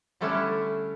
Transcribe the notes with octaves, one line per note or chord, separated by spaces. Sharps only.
D3 G3 A3 C#4 D4 E4